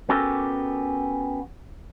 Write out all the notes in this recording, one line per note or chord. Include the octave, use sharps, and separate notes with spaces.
B3 C#4 F#4 G4 A4 A#4